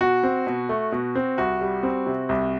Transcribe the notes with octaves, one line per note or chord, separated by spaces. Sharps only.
B2 F#4
C4
B2
A3
B2
C4
C2 F#4
G3
C4
C3
C2